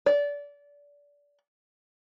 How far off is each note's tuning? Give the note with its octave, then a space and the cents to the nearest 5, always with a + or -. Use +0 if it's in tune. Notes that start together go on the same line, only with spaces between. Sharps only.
D5 -25